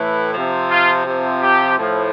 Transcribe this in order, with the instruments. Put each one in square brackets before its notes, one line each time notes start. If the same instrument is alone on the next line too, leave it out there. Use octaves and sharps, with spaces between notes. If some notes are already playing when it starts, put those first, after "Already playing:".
Already playing: [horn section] A2 E3
C3 F3
F4
C3 F3
G4
A2 F3